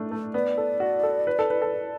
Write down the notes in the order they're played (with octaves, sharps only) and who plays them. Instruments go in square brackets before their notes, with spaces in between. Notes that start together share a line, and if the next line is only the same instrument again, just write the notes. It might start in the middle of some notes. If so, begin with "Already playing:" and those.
Already playing: [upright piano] A3 D4
A3
[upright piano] B3 [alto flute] D5
[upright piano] A4
F#4
A4
B4
A4
B4
A4